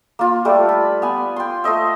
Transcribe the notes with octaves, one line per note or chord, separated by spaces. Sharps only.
A#3 F4
G3 A3 A4 D5
B5
B3 G#5
G5 C6
A3 C5 D#5 E5